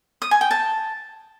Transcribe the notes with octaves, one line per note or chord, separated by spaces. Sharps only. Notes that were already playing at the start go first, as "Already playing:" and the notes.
D#6
G#5
G5
A5